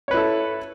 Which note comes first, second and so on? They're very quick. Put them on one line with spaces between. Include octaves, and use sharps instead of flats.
C#5 B4 E4 A4